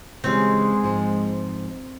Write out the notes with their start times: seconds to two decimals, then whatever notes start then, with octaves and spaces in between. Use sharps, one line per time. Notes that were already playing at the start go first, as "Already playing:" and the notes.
0.24 C#3 E3 G3 G#3 C4
0.83 G#2 F3